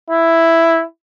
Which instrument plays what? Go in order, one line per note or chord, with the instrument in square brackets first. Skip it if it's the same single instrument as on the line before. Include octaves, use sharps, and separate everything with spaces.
[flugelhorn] E4